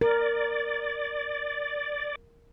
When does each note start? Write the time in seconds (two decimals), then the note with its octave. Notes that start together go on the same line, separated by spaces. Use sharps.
0.01 A#4 D5